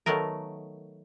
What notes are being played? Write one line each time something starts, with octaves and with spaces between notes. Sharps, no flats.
D#3 F#3 A3 B3 A#4